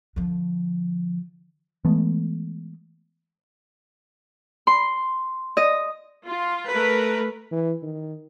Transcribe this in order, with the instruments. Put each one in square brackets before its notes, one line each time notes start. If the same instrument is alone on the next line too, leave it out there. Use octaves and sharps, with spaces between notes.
[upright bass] D3 F3
[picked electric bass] E3 G#3 A3 B3
[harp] C6
D#5
[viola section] F4
A3 A#4 B4
[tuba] E3
D#3